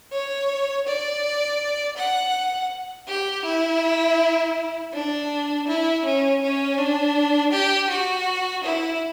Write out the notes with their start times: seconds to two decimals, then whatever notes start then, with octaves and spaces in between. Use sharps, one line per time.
0.12 C#5
0.87 D5
1.97 F#5
3.08 G4
3.45 E4
4.94 D4
5.68 E4
6.05 C#4
6.42 C#4
6.78 D4
7.53 G4
7.90 F#4
8.64 E4